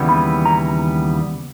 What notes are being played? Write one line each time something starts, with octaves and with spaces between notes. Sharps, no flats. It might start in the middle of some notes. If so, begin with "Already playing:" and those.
Already playing: D#2 C#3 E3 G3 B3
B5
A#5